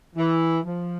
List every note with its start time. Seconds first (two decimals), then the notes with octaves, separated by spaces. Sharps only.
0.16 E3
0.64 F3